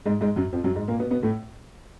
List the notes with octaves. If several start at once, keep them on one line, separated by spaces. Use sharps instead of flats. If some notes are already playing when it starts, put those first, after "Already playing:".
G#2 G#3
G#2 G#3
F#2 F#3
F2 F3
F#2 F#3
G#2 G#3
A#2 A#3
B2 B3
B2 B3
A2 A3